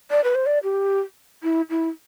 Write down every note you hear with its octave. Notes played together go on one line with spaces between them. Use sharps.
D5
B4
C5
D5
G4
E4
E4